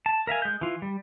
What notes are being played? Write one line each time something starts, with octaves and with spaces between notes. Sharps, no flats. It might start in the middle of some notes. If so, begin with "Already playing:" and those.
A5
A#4 E5 F5 G#5
G#3 G6
E3 F4
G3